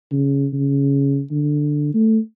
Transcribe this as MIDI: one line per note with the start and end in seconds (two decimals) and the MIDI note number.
0.12 0.47 49
0.53 1.21 49
1.31 1.90 50
1.94 2.18 57